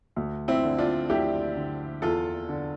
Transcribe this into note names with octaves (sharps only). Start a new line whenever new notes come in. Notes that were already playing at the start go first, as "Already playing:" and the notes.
D2
C4 E4
D3
D4 F4
D2 E4 G4
D3
E2 F4 A4
D3